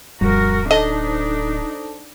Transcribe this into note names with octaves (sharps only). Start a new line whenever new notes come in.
D1 F2 G3 F#4 A#4
D4 D#4 A4 C5 D#5 A5